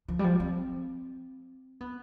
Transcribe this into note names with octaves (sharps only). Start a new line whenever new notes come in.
F3
G3
F3
C4
B3